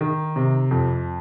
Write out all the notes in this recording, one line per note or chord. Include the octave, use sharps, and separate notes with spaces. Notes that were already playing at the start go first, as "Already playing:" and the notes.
D#3
C3
F2